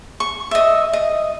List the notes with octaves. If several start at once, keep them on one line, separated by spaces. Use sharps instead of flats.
C#6
D#5 E5
D#5